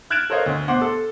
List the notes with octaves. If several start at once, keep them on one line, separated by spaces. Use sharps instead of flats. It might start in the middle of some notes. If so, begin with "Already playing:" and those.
F6 F#6 G#6 A6 D7 E7
A4 A#4 C5 C#5 D#5 F5
D2
B2 C5 F#5 C6 D6
A4